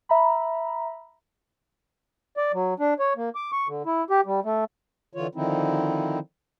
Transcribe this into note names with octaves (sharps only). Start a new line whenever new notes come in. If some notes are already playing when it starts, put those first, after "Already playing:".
E5 A#5 B5
D5
F#3
D4
C#5
A#3
D6
C#6
D3
E4
G4
G3
A3
D3 E3 F4 C#5
D3 D#3 F3 C4 D#4 E4